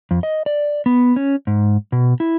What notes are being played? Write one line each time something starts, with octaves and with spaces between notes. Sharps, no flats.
F2
D#5
D5
B3
C#4
G#2
B2
E4